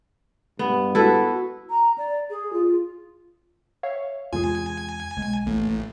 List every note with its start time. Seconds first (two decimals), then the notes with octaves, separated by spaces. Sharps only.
0.59 G2 B3
0.95 E4 F#4 A4 B4
1.70 A#5
1.98 D5
2.30 G#4
2.53 F4
3.83 C#5 E5 F5
4.33 E2 C3 G#3 F4 G#4 G#5
5.16 B1 G#3
5.47 A1 A3 A#3